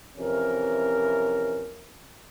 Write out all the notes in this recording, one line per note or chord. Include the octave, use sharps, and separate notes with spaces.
F2 C3 E3 C#4 A#4